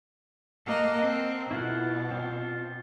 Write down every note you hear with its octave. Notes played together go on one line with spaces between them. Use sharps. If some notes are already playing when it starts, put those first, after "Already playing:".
A#3 A4 A#4 D#5 F#5
C4
B2 E4 F4 F#5
C4 F4